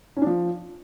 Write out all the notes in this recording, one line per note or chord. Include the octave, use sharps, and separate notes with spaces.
C#4
D4
F3